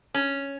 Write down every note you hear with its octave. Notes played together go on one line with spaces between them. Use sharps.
C#4